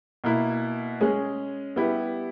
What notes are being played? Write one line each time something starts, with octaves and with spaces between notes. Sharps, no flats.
B2 A#3 E4
G#3 C#4 G#4
G3 B3 E4 G4